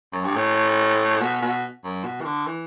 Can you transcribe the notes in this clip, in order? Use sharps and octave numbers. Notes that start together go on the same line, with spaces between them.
F#2
G2
A2
B2
B2
F#2
B2
E3
D3
E3